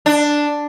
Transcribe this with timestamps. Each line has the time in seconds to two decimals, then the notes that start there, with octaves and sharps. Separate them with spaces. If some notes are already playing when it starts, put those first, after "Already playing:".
0.06 D4